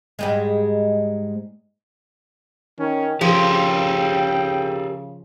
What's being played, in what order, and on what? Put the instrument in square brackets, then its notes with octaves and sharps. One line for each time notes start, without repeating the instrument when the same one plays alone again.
[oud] G#2 G3 G#3
[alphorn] D#3 [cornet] C#4
[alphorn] C#3 [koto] F3 [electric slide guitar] G4 G#4 A#4 [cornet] G5